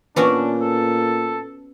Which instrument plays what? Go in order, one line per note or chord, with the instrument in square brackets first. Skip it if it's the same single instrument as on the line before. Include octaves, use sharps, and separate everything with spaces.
[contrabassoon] A#2 [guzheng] B3 C#4 F#4 [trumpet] D4
[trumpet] A4